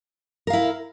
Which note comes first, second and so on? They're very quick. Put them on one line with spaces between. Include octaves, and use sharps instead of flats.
A#4 F5 E4